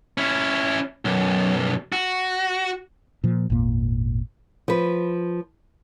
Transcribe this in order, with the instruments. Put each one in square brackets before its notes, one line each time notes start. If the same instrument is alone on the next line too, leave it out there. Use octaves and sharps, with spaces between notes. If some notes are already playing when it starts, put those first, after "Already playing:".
[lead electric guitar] C#4 E4
B1 F#2
F#4
[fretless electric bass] A#2 F3
G#1 E2 A#2 A#3
[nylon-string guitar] F3 B4